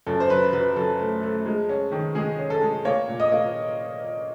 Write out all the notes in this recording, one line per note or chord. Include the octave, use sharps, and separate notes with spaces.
F#2 A4
C5
F#3 B4
F#3 B4
F#3 A4
A3
A3
G#3
C#4
D#3
G#3 G#4
C#4
A4
G#3
A#3 C#5
A#2
D#5
A#3